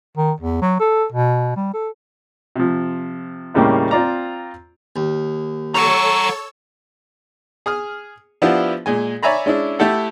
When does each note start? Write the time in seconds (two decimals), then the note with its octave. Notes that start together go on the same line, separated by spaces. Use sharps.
0.17 D#3
0.41 E2
0.62 F#3
0.80 A4
1.13 B2
1.56 G3
1.74 A4
2.56 C3 F3
3.54 D#2 A2 C#3 G3 A#3
3.91 C4 F4 D5 A#5
4.96 D#2
5.74 A4 C#5 F#5 A#5 C#6 E6
7.66 G#4 D#6 F6
8.42 F3 B3 D4 E4 F4 G4
8.86 A#2 G#3 G#5
9.23 C#5 D5 E5 G#5 A#5 B5
9.46 G#3 C#4 D4 E4
9.79 A3 E4 G4 A4 F#5